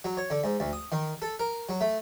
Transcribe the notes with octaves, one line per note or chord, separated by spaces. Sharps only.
F#3
C#5
D3
G#2
D2
D#6
D#3
A4
A#4
F#3
A3